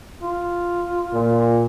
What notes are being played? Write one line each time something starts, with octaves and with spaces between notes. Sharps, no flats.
F4
A#2